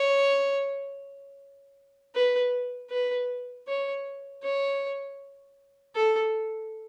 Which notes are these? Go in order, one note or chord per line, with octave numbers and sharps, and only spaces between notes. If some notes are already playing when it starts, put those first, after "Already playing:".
Already playing: C#5
B4
B4
C#5
C#5
A4